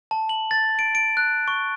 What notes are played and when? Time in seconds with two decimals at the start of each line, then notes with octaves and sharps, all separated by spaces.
0.11 A5
0.29 F#7
0.51 A6
0.79 D7
0.95 D7
1.17 F#6
1.48 C#6